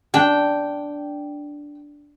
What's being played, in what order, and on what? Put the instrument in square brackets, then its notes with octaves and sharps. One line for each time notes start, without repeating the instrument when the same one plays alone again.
[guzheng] D4 [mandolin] G5